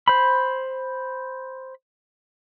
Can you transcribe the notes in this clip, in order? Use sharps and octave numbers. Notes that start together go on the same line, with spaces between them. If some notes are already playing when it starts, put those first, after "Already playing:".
C5 B5